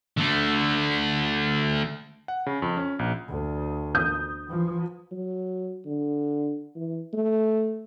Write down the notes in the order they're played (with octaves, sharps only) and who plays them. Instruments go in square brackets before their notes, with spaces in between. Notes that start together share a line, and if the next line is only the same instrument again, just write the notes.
[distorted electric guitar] D3 A3
[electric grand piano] F#5
C#3
F2
C#4
A#1
[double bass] D2
[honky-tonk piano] D#6 G6
[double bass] E3 F3
[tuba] F#3
D3
E3
A3